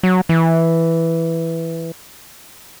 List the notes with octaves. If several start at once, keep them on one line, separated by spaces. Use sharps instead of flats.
F#3
E3